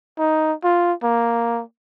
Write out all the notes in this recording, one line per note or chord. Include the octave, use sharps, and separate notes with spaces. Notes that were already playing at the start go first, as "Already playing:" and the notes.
D#4
F4
A#3